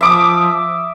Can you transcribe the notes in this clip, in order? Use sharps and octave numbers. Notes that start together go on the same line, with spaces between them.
F3 E5 D6 D#6